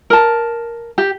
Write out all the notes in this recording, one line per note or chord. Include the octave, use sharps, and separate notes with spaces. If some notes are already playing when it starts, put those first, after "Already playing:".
A#4 A5
G4